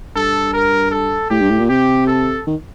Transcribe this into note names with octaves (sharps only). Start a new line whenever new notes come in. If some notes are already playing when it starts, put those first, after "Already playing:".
G2 A4
A#4
A4
A2 G4
G2
A2
A#2
C3 G4
A4
D#3